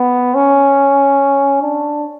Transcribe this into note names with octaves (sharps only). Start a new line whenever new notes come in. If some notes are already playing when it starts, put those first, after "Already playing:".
Already playing: B3
C#4
D4